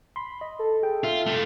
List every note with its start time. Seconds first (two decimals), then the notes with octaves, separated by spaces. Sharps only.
0.16 B5 C6
0.41 D#5
0.59 A4
0.83 G#4 G5
1.04 F4 E5
1.26 A3 F4